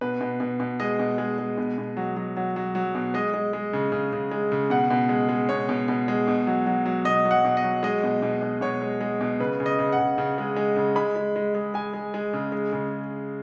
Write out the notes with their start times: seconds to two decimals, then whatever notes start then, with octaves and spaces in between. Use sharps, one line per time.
0.01 B2 B4
0.21 B2
0.40 B2
0.60 B2
0.80 G#3 D#5
0.99 B2
1.18 G#3
1.38 G#3
1.58 B2
1.78 B2
1.97 F#3
2.17 F#3
2.37 F#3
2.56 F#3
2.75 F#3
2.95 B2
3.14 G#3 D#5
3.34 G#3
3.53 G#3
3.73 C#3
3.92 C#3
4.13 C#3
4.31 G#3
4.52 C#3
4.70 B2 F#5
4.90 B2
5.09 G#3
5.29 G#3
5.49 B2 C#5
5.69 B2
5.88 B2
6.08 G#3
6.28 B2
6.47 F#3
6.67 F#3
6.86 F#3
7.05 B2 D#5
7.25 F#3
7.31 F#5
7.45 B2
7.57 D#5
7.64 F#3
7.83 G#3 D#5
8.03 B2
8.22 B2
8.42 B2
8.61 B2 C#5
8.82 G#3
9.01 G#3
9.21 B2
9.40 C#3 B4
9.60 C#3
9.66 D#5
9.79 C#3
9.93 F#5
9.98 C#3
10.18 C#3
10.38 G#3
10.56 G#3
10.76 C#3
10.96 G#3 B5
11.16 G#3
11.36 G#3
11.55 G#3
11.74 G#3 G#5
11.94 G#3
12.14 G#3
12.33 C#3
12.52 G#3
12.72 C#3